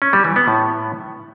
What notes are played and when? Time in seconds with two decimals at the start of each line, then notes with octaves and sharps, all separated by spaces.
0.02 C#4
0.13 G3
0.25 E3
0.36 B3
0.48 A2